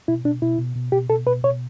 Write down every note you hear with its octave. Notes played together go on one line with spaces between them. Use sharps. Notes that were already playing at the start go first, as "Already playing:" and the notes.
B2 E4
B2 D4
B2 E4
B2
B2
B2 G4
B2 A4
B2 B4
B2 C#5